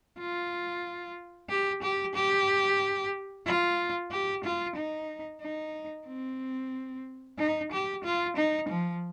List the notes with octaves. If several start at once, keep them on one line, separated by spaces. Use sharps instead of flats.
F4
G4
G4
G4
F4
G4
F4
D#4
D#4
C4
D#4
G4
F4
D#4
F3